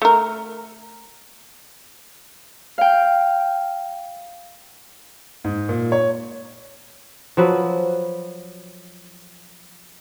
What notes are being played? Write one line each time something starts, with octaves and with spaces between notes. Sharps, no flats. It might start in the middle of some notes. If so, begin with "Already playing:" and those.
A3 A#4
F5 G5
G#2
A#2
C#5
F3 F#3 B4